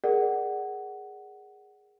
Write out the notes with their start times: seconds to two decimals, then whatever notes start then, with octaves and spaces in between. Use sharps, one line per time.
0.04 G#4 A#4 D5 F#5